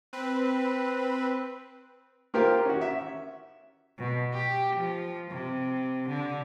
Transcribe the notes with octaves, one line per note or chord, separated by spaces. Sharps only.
C4 B4
A#3 F4 G4 A#4 C5
C#4 F#4
E5
B2
G4
F3
C3
D3